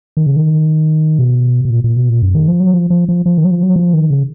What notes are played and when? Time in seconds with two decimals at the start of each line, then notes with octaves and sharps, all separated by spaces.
0.17 D#3
0.26 C#3
0.36 D#3
1.19 B2
1.65 B2
1.70 A#2
1.84 A#2
1.96 B2
2.09 A#2
2.22 F#2
2.35 D#3
2.48 F3
2.60 F#3
2.74 F3
2.90 F3
3.09 F3
3.26 F3
3.38 D#3
3.45 F#3
3.51 F3
3.63 F#3
3.76 F3
3.94 D#3
4.10 C#3